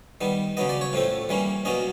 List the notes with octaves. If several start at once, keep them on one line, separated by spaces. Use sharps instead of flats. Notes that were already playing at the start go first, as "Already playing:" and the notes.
D#3 G3 B3
C#3 F#3 B3 D#5
D5
C#5
A2 F3 A3 C4
E3 G3 A#3 C#4
B2 F#3 A#3 C#4 D#5